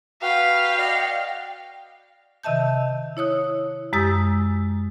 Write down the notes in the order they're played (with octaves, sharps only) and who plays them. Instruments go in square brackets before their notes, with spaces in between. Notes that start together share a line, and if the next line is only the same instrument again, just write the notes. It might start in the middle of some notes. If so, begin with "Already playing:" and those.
[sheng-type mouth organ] F#4 B4 [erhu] F5 [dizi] G5
[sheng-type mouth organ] D5 D#5 F#5
[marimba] C3 D#3 D#5 E5 A5 G6
E4 C#5 D#6 F#6
F#2 G#3 G4 D#6 E6 A6